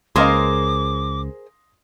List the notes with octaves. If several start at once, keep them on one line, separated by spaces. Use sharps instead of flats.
C#2 G#4 A#4 C5 D#5 F5 C6 D6